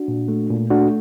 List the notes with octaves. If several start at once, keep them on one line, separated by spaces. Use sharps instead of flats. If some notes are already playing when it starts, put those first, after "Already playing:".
Already playing: D4 F#4
A#2
A3
A#2
A3 D4 F#4